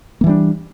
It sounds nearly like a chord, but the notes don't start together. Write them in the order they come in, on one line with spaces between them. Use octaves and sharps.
A#3 E3 G3 D4